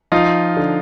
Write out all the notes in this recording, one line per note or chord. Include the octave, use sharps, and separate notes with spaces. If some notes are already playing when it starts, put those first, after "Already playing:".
F3 D#4 F4
D3